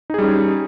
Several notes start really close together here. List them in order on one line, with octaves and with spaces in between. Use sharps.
D#4 G#4 G3 C#4